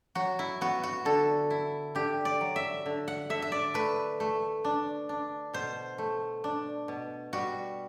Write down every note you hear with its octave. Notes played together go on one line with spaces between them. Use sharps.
F#3 F#4
E4
B3 F#4
F#4
D3 A4
E4
D3 G4
D5
F#3
E5
D3
F#5
D3 E5
E5
D5
A3 B4
A3
D4
D4
B2 C5
A3
D4
B2
G3 F#4